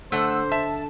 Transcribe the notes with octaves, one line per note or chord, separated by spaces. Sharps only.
D3 A3 C5 F#5 E6
E5 A5